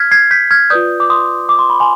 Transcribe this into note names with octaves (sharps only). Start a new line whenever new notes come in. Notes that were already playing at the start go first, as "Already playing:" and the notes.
Already playing: F6 G#6 B6
G#6 C7
G6 B6
F6 G#6
F4 B4 D5 D#6 G6
D6
C6 D#6
D6
C6
B5
G#5 C6